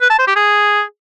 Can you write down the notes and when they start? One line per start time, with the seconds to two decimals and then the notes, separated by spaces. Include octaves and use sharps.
0.02 B4
0.10 A5
0.19 C5
0.27 G4
0.36 G#4